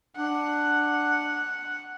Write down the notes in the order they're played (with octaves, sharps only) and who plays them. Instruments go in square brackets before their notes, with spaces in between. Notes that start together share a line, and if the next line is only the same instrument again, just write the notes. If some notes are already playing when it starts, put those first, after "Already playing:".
[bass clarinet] D4 [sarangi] F#5